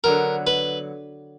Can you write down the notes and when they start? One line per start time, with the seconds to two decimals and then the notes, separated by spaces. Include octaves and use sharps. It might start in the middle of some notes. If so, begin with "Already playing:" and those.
0.04 D3 F#3 B3 A#4
0.47 B4